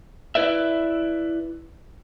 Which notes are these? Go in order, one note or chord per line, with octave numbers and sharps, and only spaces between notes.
E4 B4 D5 E5